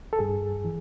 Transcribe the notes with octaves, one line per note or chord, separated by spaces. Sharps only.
A4
G2 G#4
E3